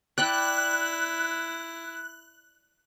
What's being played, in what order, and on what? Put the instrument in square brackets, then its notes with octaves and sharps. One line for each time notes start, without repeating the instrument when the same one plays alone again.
[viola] E4 [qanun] D5 G5 B5 [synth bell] F#6